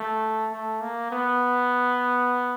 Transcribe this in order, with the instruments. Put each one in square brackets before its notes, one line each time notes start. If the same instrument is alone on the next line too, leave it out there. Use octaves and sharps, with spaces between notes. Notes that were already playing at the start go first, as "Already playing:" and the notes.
Already playing: [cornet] A3
A3
A#3
B3